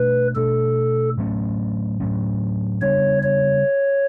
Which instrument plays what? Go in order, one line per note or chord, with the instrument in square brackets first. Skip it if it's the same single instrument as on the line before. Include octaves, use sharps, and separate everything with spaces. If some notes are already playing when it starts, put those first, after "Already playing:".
Already playing: [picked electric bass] B2 A3 D4 [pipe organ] B4
[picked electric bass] B2 A3 D4 [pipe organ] A4
[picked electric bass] A2 F#3 A3 C#4
A2 F#3 A3 C#4
[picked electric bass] C#3 G3 B3 D4 [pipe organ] C#5
[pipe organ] C#5